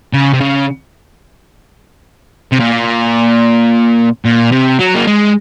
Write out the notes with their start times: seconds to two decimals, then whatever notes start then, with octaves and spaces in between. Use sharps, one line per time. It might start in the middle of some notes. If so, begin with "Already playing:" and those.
0.13 C#3
0.34 C3
0.41 C#3
2.52 C3
2.60 A#2
4.25 A#2
4.52 C3
4.80 F#3
4.96 A#3
5.07 G#3